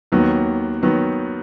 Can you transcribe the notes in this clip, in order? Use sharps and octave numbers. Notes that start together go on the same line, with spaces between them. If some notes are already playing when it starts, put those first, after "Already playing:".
D#2 D#3 F#3 B3
D#3 F#3 B3